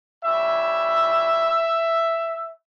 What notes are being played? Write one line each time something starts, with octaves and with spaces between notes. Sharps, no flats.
G3 C#4 E4 E5